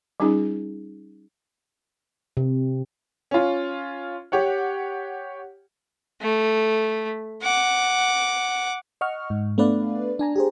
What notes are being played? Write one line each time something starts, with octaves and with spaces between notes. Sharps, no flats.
G3 C#4 D#4 F4 G#4
C3
C#4 F4
G4 C#5 F#5
A3
F#5 D6
D#5 F#5 C#6 F6
G#2
A3 B3 D4 B4 D5 F5
D4 G#5 A#5
G4 G#4 C5